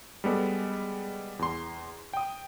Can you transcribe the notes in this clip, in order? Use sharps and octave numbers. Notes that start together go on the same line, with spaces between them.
G3 G#3 B3 A4
E2 C6
G5 D#6